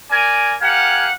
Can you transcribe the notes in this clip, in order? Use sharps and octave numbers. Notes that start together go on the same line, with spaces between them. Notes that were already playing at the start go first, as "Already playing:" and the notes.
A#4 D5 G#5
G4 A#4 F5 F#5 G#5